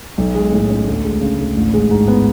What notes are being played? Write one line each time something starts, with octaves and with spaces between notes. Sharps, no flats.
B1
G#3
A2
C#4
D2
G#3
C#3
D2
A1
G#3
G#2
B3